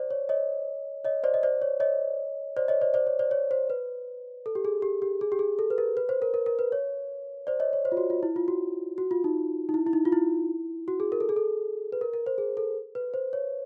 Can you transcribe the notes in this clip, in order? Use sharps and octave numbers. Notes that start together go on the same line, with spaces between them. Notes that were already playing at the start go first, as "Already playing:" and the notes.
Already playing: C5 D5
C#5
C#5 D#5
C#5 D#5
C5 D5
D#5
C5 D5
C#5
C#5 D#5
C5 D5
C#5 D#5
C5 D5
C5 D5
C#5
C5 D5
C#5
C5
B4
A4
G4
G#4
G4
G4
G#4
G4
G#4
A4
B4
A#4
B4
C5
A#4
A#4
A#4
B4
C#5
C5 D5
C#5 D#5
C#5
C5
F4
F#4
F4
E4
F4
F#4
F#4
F4
D#4
D#4
E4
E4
D#4
F4
E4
F#4
G#4
A#4
A4
G#4
A4
B4
A#4
A#4
C5
G#4
A4
B4
C5
C#5